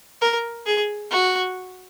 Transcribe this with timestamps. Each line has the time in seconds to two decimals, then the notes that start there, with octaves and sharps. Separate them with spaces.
0.21 A#4
0.66 G#4
1.11 F#4